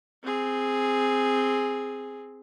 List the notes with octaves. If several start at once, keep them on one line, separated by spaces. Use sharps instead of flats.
C4 G#4